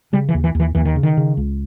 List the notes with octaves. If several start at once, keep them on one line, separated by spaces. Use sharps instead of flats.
C#3 G3
E3
D#2
E3
D#2
E3
D#2 E3
D#3
C#3
D#3
C#3
C#2